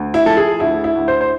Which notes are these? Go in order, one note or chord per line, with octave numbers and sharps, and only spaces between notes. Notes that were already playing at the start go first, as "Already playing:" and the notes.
Already playing: D2
E4
F3 A4
G#4
D2 E4
E4
D2
C5
C5